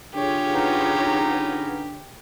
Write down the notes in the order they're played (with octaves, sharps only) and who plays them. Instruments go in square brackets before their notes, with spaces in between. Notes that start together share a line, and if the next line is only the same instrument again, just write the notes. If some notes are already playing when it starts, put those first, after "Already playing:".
[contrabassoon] D3 [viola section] F4 G#4 C#5 [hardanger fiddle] G4
[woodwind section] B3 C#4 D#4